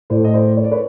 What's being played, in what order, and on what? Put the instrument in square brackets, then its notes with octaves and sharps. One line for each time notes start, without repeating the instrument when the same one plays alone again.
[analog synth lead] A2 [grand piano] C5 D5
[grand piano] D#5
C5 D5
C#5
D5
B4 C#5